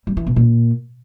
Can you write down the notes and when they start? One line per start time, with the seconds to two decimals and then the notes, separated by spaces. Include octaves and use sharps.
0.07 G3
0.17 E3
0.27 B2
0.36 A#2